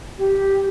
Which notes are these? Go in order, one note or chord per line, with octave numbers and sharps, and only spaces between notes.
G4